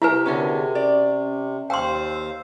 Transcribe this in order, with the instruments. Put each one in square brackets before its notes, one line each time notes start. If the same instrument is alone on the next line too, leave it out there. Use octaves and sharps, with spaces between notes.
[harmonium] C3 [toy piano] E4 B4 [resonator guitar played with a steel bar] A#4 E5
[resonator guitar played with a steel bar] D3 B3 C#4 [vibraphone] F#4 G#4 A#4
[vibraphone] C#4 [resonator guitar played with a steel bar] D5
[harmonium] D#2 C5 F5 [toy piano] G5 C6 [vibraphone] E6